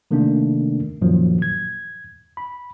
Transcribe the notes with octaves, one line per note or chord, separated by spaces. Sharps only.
C3 D#3 A3 A#3 D4
F#2 A#2 D#3 F3 F#3
G#6
B5